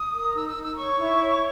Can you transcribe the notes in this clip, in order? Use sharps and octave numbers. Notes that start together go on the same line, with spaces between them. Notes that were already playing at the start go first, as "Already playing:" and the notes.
Already playing: D#6
A#4
D#4 E6
E6
D#4
E6
C#5 C#6
E4
C#5